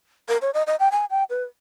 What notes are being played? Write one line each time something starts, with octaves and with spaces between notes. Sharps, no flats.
A#4
C#5
D#5
D#5
G5
G#5
G5
B4